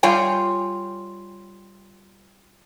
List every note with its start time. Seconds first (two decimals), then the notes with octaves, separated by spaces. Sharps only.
0.03 G3 F4 C#5 G5 G#5